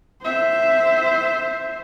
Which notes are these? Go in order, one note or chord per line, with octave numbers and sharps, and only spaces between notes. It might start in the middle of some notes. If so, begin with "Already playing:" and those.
C5 E5